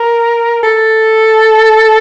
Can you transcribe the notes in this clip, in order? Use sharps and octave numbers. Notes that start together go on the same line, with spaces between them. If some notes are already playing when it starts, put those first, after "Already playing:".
Already playing: A#4
A4